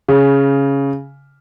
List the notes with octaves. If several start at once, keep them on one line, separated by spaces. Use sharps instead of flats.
C#3